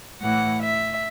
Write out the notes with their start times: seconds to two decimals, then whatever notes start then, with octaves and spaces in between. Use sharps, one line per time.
0.21 A2 E3 F#5
0.61 E5